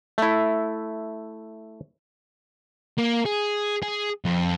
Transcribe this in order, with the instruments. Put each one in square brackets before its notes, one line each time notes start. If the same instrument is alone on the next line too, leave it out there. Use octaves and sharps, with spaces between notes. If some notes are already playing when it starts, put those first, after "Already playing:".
[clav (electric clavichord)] A3 E4
[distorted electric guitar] A#3
G#4
G#4
F2